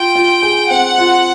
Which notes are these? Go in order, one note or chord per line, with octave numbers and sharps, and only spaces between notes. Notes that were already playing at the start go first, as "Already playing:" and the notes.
Already playing: F4 G5
F4
G#4
C4 F#5
F4